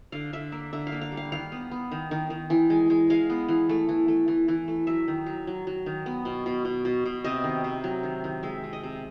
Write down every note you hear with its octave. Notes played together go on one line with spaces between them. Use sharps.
D3 F5
D3 E5
A#3 E5
D3 E5
F5
A#3
F5
G3
F5
D#3 F5
B3
B3
D#3
D#3
D#3
E3
G#3
G#3
G#3 F5
B3
E3
A3
E3
A3
E3
E3
A3
F#3 E5
D#3
F#3
F#3
F#3
D#3
B3
B2
B2
B2
B2
B2
C3 D#5
D#3
C3
F#3
D#3
D#3
G#3 E5
C3
D#5
C3